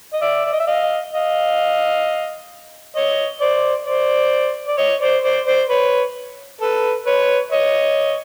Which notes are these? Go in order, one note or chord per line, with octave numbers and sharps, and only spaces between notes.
D#5
D5 E5
D5
D#5
E5
D#5 F5
D#5 F5
C#5 D#5
C5 D5
C5 D5
D5
C#5 D#5
C5 D5
C5 D5
C5 D5
B4 C#5
A4 B4
B4 C#5
C#5 D#5